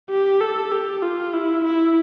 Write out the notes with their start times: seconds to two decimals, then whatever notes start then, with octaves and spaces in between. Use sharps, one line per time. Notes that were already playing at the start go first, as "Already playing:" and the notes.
0.10 G4
0.41 A4
0.72 G4
1.02 F4
1.33 E4
1.65 E4